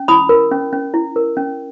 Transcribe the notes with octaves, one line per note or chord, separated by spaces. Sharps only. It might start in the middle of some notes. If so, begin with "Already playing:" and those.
Already playing: C#4
E4 B5 D#6
A#4
C#4
C#4
E4
A#4
C#4